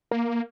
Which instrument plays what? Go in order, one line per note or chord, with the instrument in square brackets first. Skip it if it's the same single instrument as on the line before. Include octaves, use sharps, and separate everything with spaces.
[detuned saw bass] A#3